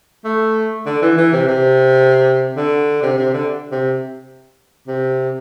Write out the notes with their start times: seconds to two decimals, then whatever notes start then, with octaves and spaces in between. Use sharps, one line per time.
0.25 A3
0.86 D3
1.02 E3
1.17 E3
1.33 C3
1.48 C3
2.56 D3
3.02 C3
3.17 C3
3.33 D3
3.72 C3
4.87 C3